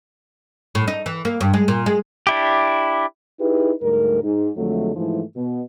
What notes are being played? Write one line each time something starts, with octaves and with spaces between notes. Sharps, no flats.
A2
D#4
E3
A#3
G2
G#3
A#2
G#3
D4 E4 G4
D#4 E4 G4 G#4 B4
D2 G#2 G3 A3 A#4
G#2
F2 D3 F#3 G#3 A3
G#2 E3 F3 A3 E4
B2